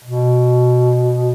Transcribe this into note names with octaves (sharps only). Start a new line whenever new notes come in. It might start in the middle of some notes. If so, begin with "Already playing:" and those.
B2